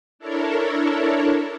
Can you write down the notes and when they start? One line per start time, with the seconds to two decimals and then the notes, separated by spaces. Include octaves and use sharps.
0.19 D4 E4 A4 A#4 C#5